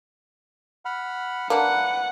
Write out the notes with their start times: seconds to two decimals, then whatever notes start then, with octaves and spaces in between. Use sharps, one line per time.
0.85 F#5 B5 F6
1.50 A#3 D4 B4 F#5